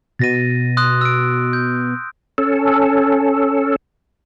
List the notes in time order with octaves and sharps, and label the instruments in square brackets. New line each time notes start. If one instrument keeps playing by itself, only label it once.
[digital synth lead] B2 [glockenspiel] A6 A#6 D#7
[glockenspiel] C6 D#6 F#6
E6 D7
G6
[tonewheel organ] C#4 A4